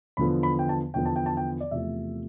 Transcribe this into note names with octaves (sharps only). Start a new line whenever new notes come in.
E2 D3 F3 B3 B5
B5
G5
A5
E2 D3 F3 B3 G5
A5
G5
A5
G5
D5
E2 C3 F3 A3 E5